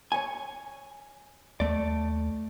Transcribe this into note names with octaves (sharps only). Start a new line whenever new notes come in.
C#5 G#5
D#2 A3 D5